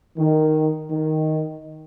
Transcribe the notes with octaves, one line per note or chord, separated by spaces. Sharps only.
D#3
D#3